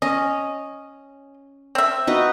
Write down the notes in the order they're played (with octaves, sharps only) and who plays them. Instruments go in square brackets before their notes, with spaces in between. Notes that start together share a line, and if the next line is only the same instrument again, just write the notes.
[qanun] C#4 [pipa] D#5
[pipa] C4 E5
[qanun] D#4 F#4 B4